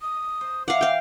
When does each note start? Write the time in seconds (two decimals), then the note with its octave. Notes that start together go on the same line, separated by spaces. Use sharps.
0.02 D#6
0.41 C5
0.68 E3 F5 F#5 D6
0.81 F5 G5